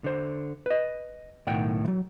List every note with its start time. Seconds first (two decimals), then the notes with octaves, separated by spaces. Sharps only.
0.04 D3 C5
0.66 B4 D#5
1.47 B1 A2 D#3 F#5 G5
1.84 E3 F#3